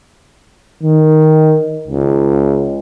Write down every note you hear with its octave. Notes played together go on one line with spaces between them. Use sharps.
D#3
C#2